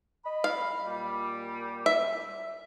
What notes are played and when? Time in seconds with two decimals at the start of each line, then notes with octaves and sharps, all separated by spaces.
0.24 D#5 B5
0.44 F5
0.84 A#2 G3
1.86 E5